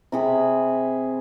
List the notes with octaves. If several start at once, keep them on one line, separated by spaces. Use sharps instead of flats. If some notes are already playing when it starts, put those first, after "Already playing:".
C3 G#4 B5